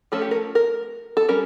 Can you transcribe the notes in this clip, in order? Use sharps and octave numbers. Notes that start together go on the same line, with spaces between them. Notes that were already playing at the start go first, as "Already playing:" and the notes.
F3 A3 C#4 A4
G4
A#4
A#4
A4
G3 C#4 A#4